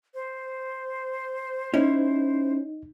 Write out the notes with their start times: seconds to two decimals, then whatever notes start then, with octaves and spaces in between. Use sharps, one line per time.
0.14 C5
1.74 C#4 D#4 E4